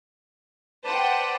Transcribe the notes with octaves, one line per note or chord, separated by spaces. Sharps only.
B4 C5 D5 F#5 G5 A5